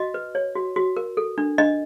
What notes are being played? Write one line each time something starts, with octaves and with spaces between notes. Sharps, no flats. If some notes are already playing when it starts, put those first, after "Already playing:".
Already playing: F#4 D#5
B4
C#5
F#4
F#4
A#4
A4
D4
D4 D#5